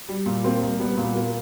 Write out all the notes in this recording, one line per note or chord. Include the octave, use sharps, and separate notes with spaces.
G3
A#2
A#3 C4
C2
G3 B3
A#2
B3
A#3